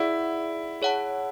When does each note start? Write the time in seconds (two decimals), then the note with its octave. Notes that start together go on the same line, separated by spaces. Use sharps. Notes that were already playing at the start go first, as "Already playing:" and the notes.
Already playing: E4 G#4 D5 F#5
0.82 G#4 C#5 F#5 A5